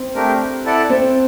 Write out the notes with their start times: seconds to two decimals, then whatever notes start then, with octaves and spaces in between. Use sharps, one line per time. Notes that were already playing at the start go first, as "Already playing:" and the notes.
Already playing: C4
0.15 A3 D4 G4 A#4
0.65 E4 A4 D5 F#5 A5
0.90 C4